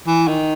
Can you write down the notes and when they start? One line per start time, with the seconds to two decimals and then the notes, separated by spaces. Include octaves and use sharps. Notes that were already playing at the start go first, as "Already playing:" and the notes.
0.07 E3
0.28 D#3